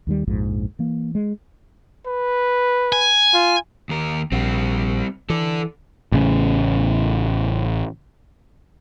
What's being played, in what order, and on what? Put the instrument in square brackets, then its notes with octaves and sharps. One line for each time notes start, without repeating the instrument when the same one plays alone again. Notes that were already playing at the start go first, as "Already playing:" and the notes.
[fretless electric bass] D#2 D#3 G3
A#1 F2 G#2 F3
E3 A#3
G#3
[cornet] B4
[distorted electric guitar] G#5
[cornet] F4
[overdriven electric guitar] D#2 A#4
[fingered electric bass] A#1 [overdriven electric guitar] G3 C4
[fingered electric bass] E3 [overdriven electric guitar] A4 D5
[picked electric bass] A1 C#3